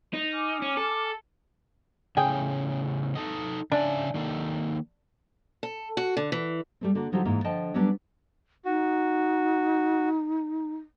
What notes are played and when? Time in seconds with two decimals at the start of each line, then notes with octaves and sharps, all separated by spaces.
0.14 D#4
0.32 G#5 D6 F6
0.62 C#4
0.77 A4
2.17 A2 C#3 G#4 G5
3.15 D#4 A4 D#5
3.72 C#3 D4 E5 G#5
4.14 D#3 A#3 A4
5.63 A4
5.97 F#4
6.17 D3
6.32 E3
6.81 G3 A3 C4
6.95 D3 A#3 F#4
7.12 D3 F3 F#3 D#4 F4 G4
7.25 G#2 E3 A#3 D#4 F4
7.44 D3 F3 D#5 G5 A5
7.74 F#3 G3 B3 C#4 D4
8.65 D#4 F#4